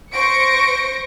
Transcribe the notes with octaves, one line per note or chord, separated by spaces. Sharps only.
C5 C#6 A#6 C#7 D7